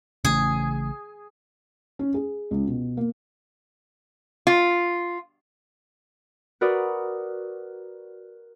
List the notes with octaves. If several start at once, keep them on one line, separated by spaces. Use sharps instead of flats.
A1 A2 C#3 G#4
C#4
G#4
C#2
B2
A#3
F4
F#4 A#4 B4 D5 D#6